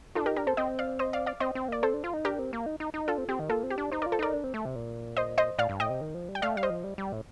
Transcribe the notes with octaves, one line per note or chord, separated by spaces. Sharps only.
D#4 F4 A4
D4
D#4 G4 A#4
D4 G4 A#4
C4 A4 C5
C4 D#5 G5
D5 F5
C5 D#5
D5 F5
D5 F5
C4 C5 D#5
C4
A#3 D5
C4 A4 C5
D4
F4
D#4
D4 G4 A#4
C4
A#3
D#4
D#4
D#4
D4 F4 A4
C4
C4 G4
D#3
A#3 F4 A4
C4
G4
D4
D#4 C5
A#4 D5
F4
A4 C5
D#4 A#4 D5
D4
C4
A3
C3
A#2
C5 D#5
C5 D#5
A2 D5 F5
G2
A2 D#5 G5
C3
D#3
F3
G3
G5
A3 D5 F5
G3 F5
C5 D#5
F3
G3
G3
A2